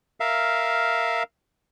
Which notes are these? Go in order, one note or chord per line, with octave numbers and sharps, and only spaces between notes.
A#4 E5 F5